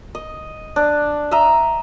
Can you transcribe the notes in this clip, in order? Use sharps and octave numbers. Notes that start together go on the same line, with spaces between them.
D#5
D4
D#5 E5 A#5